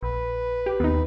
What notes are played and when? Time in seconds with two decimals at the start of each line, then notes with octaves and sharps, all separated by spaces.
0.03 A#1 B4
0.66 G4
0.80 D#2 B3 D#4